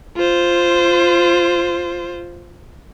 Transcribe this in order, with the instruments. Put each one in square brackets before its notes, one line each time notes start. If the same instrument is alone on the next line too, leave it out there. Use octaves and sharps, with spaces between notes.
[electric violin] F4 C5